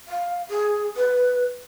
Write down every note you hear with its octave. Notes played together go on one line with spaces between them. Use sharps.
F5
G#4
B4